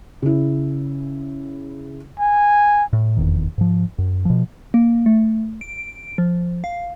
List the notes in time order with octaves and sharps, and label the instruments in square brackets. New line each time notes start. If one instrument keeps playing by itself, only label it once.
[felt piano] C#3 E4
[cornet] G#5
[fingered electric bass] A2
F1 E2 D#3
G#2 F3
F#2
B2 F3
[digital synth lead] A#3
A3
D7
F3
F5